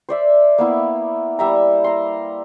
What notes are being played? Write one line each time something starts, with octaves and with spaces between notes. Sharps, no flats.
C5 D5 E5
A#3 B3 E4
G3 E5 A#5
A#5 C6